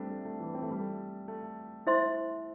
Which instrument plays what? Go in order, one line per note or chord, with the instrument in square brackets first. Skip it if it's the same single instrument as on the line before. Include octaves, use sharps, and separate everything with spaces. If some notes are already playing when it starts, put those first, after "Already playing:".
Already playing: [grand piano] G3 A3 C4 D4
A3
A3
E3
C4
A3
G3
A3
A3
[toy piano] E4 C5 E5 C6